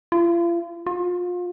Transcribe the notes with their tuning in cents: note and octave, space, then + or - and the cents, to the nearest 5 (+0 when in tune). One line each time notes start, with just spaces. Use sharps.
F4 -40
F4 +30